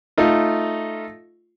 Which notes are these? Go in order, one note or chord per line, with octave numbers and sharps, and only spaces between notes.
A3 D#4 F4